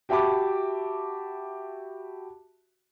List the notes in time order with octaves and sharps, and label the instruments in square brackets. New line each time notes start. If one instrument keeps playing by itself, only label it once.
[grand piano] F#4 G4 E5 A5 B5 D6